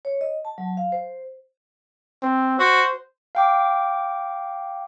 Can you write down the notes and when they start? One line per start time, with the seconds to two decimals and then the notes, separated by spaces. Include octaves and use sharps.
0.05 C#5
0.21 D#5
0.45 A5
0.58 F#3
0.77 F5
0.92 C5
2.23 C4
2.59 F#4 C5
3.35 F5 G5 D6